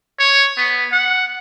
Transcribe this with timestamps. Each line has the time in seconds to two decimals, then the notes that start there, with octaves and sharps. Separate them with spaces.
0.19 C#5
0.58 B3
0.92 F#5